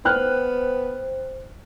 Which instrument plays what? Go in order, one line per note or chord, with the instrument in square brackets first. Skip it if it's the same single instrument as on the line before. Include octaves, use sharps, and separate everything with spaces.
[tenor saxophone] B3 [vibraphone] C5 [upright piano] G5 F6 F#6